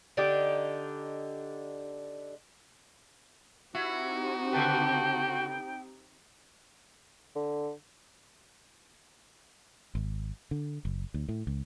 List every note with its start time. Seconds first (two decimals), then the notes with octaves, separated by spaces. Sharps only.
0.17 D3 D4 D#4 G4
3.75 C4 D#4 E4 F#4 G4
4.53 C#3 A4 B4 G5
7.36 D3
9.95 G#1
10.51 D3
10.85 F#1
11.14 D2
11.29 A2
11.47 C#2